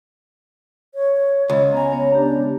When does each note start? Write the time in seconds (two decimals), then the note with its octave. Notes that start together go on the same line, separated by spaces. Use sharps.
0.95 C#5
1.50 C#2
1.73 B3 G#5 A#5
1.92 B3 C#5
2.15 D4 G4